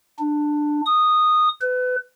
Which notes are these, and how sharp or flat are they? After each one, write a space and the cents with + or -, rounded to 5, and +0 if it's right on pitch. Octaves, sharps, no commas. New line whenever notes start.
D4 +15
D#6 -10
B4 +30